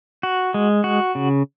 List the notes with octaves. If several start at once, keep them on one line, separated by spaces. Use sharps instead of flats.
F#4
G#3
F#4
C#3